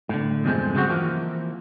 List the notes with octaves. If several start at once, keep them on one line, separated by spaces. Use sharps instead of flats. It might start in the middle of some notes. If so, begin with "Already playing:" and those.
A2 D3
E2 G2 C3 F3 G#3 C4
C#3 F#3 G#3 C4 F#4
E3 F3 A#3